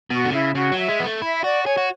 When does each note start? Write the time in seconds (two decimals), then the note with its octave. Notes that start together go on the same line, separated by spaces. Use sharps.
0.10 B2 F#4
0.24 D3
0.33 C#3 E4
0.55 C#3 F#4
0.72 F#3
0.77 E5
0.88 G#3
1.00 B3
1.05 A3
1.21 E4 E5
1.44 F#4 D5
1.66 G#4 C#5
1.77 F#4